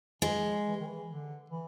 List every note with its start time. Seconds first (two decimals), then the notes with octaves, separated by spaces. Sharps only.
0.22 E3 G#3
0.44 F3
0.65 E3
0.80 D#3
0.86 E3
1.08 D3
1.50 E3